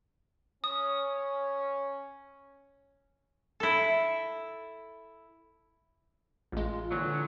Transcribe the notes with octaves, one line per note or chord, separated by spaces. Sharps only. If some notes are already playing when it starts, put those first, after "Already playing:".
C#4 D#6
E4 A4
A1 G#3 F4
A#2 D3 E3 F#3